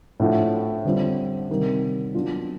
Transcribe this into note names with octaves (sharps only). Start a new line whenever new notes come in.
A2 F3 A3 D4 F#4
D3 G3 C4 F4
C3 D#3 G3
F#3 B3 D4 F4